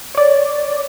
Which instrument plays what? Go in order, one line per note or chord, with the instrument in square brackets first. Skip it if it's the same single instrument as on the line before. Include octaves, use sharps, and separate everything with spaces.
[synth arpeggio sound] C#5 D5